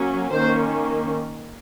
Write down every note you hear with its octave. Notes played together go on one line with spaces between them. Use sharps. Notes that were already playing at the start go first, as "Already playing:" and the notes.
Already playing: F#3 A#3 C#4
D#3 A#3 C#4 C5